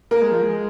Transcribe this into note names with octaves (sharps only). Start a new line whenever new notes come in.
A#3 A#4
G#3
F3
G#3